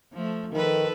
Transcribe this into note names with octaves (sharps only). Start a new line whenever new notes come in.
F3 A3
D#3 F3 A4 B4